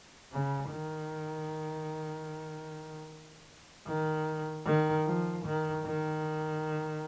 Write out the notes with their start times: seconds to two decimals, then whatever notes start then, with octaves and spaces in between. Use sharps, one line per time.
0.32 C#3
0.71 D#3
3.87 D#3
4.66 D#3
5.06 F3
5.45 D#3
5.85 D#3